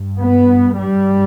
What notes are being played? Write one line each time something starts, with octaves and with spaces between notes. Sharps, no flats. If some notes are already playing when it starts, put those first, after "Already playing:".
Already playing: G2
B3
G3